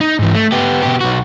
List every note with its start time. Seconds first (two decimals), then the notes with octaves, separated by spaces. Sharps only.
0.01 D#4
0.19 G#2 E3
0.34 A3
0.52 B3 G4
0.82 B2 G4
1.01 B1 F#4